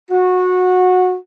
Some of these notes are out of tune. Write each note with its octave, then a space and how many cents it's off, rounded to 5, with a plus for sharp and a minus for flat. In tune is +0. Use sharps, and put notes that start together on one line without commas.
F#4 -20